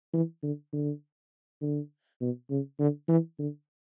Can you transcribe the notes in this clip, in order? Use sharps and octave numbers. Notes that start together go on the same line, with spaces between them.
E3
D3
D3
D3
B2
C#3
D3
E3
D3